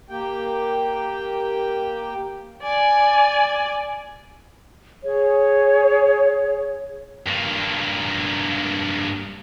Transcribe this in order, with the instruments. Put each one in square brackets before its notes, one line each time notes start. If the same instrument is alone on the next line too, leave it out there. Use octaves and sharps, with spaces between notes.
[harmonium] A#3 G4 G5
[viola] D5 G#5
[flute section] G#4 C#5
[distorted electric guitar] G2 A#3